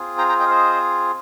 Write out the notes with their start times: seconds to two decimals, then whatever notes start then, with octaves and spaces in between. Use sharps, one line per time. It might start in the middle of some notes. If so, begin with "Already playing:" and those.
Already playing: C4 F4 G#4
0.18 G5 A#5
0.29 G5 A#5
0.40 D#5 G5
0.46 F5
0.50 C5 D#5